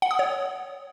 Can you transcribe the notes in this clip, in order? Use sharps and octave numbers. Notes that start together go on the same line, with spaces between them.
F#5
D#6
C#5